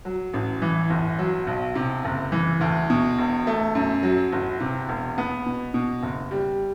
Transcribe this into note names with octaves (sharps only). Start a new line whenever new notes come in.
F#3
A1
E3
G1
F#3
B1
C3
F#1
E3
D2
B2
E1
A3
F#2
F#3
G1
C3
E1
B3
B2
B2
F#1
G3